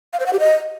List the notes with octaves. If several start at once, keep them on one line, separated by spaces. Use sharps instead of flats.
F5
C5
F#5
G4
D#5